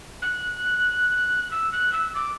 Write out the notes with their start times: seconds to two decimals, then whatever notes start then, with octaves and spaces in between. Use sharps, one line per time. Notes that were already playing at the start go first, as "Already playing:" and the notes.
0.22 F#6
1.51 E6
1.72 F#6
1.93 E6
2.15 D6